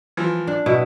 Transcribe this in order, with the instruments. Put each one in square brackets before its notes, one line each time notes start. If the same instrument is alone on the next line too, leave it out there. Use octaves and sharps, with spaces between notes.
[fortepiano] E3 F3
[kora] D4
[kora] B2 [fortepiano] E4